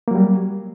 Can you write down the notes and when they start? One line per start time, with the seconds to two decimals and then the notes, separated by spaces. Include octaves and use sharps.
0.08 A#3
0.11 F#3
0.15 G3